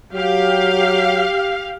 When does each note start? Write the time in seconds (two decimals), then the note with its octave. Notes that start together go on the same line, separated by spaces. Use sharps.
0.14 F#3 G4 F5